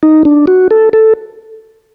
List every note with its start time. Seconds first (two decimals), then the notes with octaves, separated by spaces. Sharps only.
0.03 D#4
0.25 D4
0.47 F#4
0.71 A4
0.93 A4